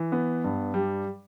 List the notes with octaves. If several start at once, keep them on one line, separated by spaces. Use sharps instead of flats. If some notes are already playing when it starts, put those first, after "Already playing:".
Already playing: E3
B3
G2
G3